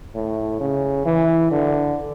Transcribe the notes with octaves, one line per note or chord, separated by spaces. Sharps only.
A2
C#3
E3
D3